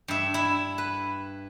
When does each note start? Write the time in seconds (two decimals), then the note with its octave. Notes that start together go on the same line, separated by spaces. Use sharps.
0.08 G2 E5
0.34 E4
0.78 B4